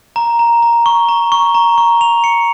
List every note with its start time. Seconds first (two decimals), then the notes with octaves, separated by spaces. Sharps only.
0.16 A#5
0.39 A#5
0.63 A#5
0.86 C#6
1.09 A#5
1.32 C#6
1.55 A#5
1.78 C#6
2.01 F7
2.24 C#7